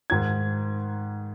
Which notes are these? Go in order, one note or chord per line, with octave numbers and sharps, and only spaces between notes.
G#2 D#3 G#6